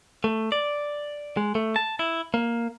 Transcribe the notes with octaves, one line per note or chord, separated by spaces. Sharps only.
A3
D5
G#3
A3
A5
E4
A#3